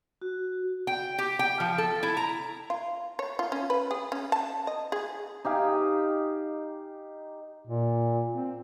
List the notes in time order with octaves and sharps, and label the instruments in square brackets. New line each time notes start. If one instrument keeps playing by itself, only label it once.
[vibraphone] F#4
[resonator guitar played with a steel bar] G5
G4
G5
F3
A4
E4
A#5
[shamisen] F4
C#5
F4
C#4
B4
G#4
C#4
A5
D#5
G#4
[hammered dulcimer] D#4 G4 F5 G#5
[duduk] A#2
C4